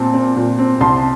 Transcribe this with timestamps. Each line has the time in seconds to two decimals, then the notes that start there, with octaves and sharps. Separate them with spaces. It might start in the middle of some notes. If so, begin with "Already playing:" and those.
Already playing: A#2 C4 A5
0.14 C4
0.36 A#2
0.59 C4
0.81 C2 A5 C6